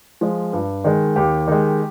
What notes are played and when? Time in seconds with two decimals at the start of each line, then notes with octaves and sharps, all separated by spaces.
0.21 F3 G#3
0.53 G2
0.84 D#3 G#3
1.16 D#2 G4
1.47 D#3 G#3